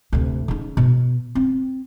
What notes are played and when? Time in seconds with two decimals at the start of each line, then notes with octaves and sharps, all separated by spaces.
0.13 D2 C3
0.48 C#3 D#4
0.77 B2
1.35 C4